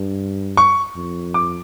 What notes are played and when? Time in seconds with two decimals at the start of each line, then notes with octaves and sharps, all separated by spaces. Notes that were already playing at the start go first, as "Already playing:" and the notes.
Already playing: G2
0.57 C#6
0.96 F2
1.34 D6